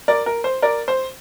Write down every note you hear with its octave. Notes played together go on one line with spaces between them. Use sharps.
A#4 D5
A#4
C5
A#4 D5
C5